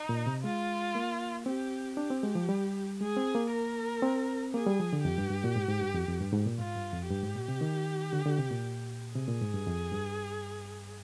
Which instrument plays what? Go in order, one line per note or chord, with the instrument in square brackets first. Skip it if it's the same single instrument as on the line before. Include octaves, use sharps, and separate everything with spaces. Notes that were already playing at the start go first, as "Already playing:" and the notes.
Already playing: [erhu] D#4
[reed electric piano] A#2
C3
[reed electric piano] G#3 [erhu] F4
[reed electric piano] A#3
[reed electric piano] C4 [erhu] G4
[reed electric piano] D4 [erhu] G4
[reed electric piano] C4
G#3
F3
G3
[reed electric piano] G#3 [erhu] G#4
[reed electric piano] C4
A#3
[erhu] A#4
[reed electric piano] C4
[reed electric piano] A#3 [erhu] G#4
[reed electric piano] G3
F3
D3
[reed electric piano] F2 [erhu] G4
[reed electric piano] G2
G2
A#2
G#2
G#2
G2
F2
F2
G2
G#2
A#2
[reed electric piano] G#2 [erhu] F4
[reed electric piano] G2
F2
[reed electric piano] G2 [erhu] G4
[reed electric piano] G#2
A#2
C3
D#3
D3
D3
C3
A#2
[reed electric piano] C3 [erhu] G#4
[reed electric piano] A#2
G#2
G2
F2
G2